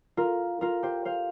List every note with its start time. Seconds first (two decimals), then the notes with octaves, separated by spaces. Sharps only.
0.17 F4 A#4
0.61 F4 A#4
0.83 G4 C5
1.05 C5 F5